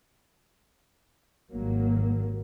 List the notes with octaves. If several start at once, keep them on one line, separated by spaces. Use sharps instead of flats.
G#1 G2 F#3 A#3